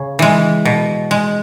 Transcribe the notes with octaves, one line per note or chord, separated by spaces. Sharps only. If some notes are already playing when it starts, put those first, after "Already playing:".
Already playing: C#3 C#4
E3 G#3
B2
G#3